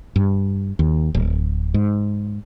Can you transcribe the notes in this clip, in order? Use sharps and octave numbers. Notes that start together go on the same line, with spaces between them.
G2
D#2
D1
G#2